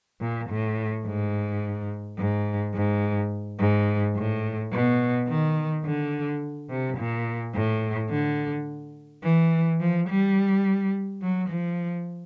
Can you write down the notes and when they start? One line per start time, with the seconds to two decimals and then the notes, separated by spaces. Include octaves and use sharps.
0.21 A#2
0.49 A2
1.06 G#2
2.18 G#2
2.75 G#2
3.60 G#2
4.16 A2
4.73 B2
5.28 D#3
5.85 D3
6.70 C3
6.98 A#2
7.55 A2
8.10 D3
9.23 E3
9.80 F3
10.09 G3
11.22 F#3
11.49 F3